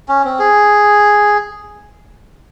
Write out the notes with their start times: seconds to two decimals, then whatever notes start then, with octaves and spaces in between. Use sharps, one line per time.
0.08 C#4
0.25 C4
0.39 G#4